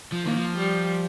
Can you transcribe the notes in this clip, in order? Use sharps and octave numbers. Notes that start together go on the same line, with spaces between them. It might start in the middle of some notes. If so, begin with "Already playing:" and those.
F3
D#3 A#3
F3
G3